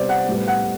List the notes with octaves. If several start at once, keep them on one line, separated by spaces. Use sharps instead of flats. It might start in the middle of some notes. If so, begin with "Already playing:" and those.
Already playing: C3 G3 B3 C5 D5
F#5
A2 G3 B3
F#5